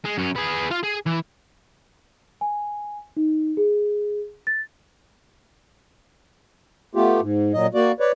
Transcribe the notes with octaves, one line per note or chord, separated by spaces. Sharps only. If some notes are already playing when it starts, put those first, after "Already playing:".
G#3
F#2 C#4
B3 G#4
F4 F5
G#4
E3
G#5
D#4
G#4
A6
A3 B3 F4 G4
G#2
A#2 F#3 D#5
A#3 F#4 D5
B4 C#5 D5